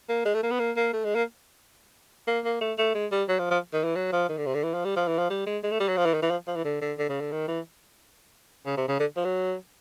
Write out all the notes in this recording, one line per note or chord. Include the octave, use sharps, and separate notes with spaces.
A#3
G#3
A3
A#3
B3
A#3
A#3
A3
G#3
A#3
A#3
A#3
A3
A3
G#3
G3
F#3
F3
F3
D#3
E3
F#3
F3
D#3
D3
C3
D3
E3
F3
G3
F3
E3
F3
G3
G#3
G#3
A3
G3
F#3
F3
E3
D#3
E3
F3
F3
E3
D3
D3
D3
C#3
D3
D#3
E3
C#3
C3
C#3
D3
F3
F#3